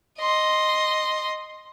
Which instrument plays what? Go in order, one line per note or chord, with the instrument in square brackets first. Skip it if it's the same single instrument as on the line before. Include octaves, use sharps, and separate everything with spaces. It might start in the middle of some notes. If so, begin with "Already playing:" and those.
[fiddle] D#5 C6